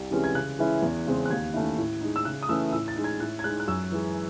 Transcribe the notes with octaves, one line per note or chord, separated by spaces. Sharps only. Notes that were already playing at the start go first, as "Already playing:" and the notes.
Already playing: C2
C3 E3 G#3 C#4
G#6
C#3 F#6
E3 G#3 C#4 E4
E2
C#3 G#3 C4
F#6
D#2 G#6
D#3 A3 C#4 E4
A2
G#3 D#4
E6
C#3 F#6
D#6
E3 A3 C#4 E4 E6
A2 E6
A6
G#3 D#4
G#6
A2 F#6
G#6
G#3 D#4 F#6
F#6
F#2 E6
E3 G#3